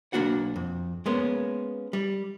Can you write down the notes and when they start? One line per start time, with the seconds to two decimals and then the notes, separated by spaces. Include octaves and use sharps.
0.13 B1 A#3 D4 F#4 F#5
0.56 F2
1.06 G#3 A#3 B3 C#4
1.93 G3